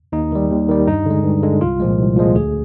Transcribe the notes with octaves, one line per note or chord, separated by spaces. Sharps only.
D#2 D#4
D#3 G3
D#2
D#3 G3
G2 D#4
D3 G#3
G2
D3 G#3
C2 F4
A#2 F3 G#3
C2
A#2 F3 G#3
D2 G#4